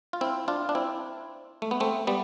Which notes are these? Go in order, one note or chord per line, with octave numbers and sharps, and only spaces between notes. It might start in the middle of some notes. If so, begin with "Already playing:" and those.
F4
C4 E4
D4 F4
D4
C4 E4
A3
B3
A3 C4
G3 B3